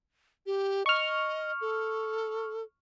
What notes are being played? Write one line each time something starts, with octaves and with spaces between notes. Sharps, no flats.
G4
D#5 C#6 F6
A4